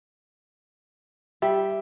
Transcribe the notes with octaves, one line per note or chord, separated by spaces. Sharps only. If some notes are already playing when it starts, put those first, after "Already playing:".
G3 E5